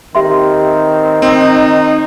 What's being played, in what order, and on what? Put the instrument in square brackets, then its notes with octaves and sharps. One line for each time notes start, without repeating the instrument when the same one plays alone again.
[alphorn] D#3 [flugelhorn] C4 [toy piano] G4 E5 C6
[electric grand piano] C4 [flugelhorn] D#4